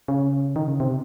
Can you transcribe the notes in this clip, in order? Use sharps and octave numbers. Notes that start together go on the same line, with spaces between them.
C#3
D#3
C#3
C3